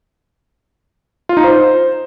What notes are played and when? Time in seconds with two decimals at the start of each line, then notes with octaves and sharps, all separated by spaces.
1.29 F4
1.37 D#4
1.44 C5